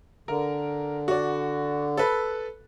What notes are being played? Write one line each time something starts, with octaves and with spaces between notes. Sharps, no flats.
D3 A#4
F#4 D5
A4 B4